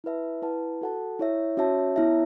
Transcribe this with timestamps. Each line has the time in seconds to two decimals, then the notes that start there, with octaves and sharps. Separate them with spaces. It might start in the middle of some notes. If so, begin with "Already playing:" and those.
0.04 E4 B4 E5 A5
0.42 E4 B4 F#5 A5
0.82 F#4 A4 F#5 A5
1.19 E4 C#5 E5
1.57 C#4 F#4 C#5 E5 A5
1.96 B3 E4 C#5 E5 A5